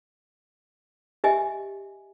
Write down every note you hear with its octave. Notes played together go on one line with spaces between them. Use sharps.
G4 D#5 E5 G#5